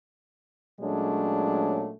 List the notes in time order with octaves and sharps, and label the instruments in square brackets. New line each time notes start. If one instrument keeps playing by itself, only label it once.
[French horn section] A#2 F#3 G#3 A3 C#4 D4